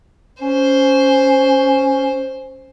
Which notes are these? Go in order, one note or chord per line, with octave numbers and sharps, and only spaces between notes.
C#4 C5